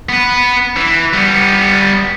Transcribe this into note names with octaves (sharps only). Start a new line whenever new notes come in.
B3 B4
E3
G3 B3